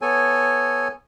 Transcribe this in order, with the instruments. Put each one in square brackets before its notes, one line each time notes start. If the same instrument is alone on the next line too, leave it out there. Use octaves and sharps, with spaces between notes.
[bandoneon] B3 A4 C#5 G#5